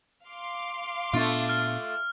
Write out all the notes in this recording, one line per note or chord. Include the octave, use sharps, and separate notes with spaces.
F5 C6 D6
A#2 A3 B3 D4 F4
F6